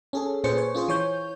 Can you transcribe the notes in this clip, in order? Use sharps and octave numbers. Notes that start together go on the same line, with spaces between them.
C#4 G#4 A4
A#2 C#4 G#4 B4 C5 C#7
C#5
C#4 F4 G#4 C5
E3 C#5 G6